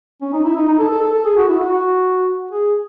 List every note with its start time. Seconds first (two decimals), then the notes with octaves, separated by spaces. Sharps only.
0.22 C#4
0.33 D#4
0.45 E4
0.56 D#4
0.68 D#4
0.79 A4
0.91 A4
1.02 A4
1.13 A4
1.25 G#4
1.37 F#4
1.48 E4
1.60 F#4
2.51 G#4